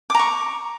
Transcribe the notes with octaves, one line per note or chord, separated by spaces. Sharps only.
A#5 C#6 D6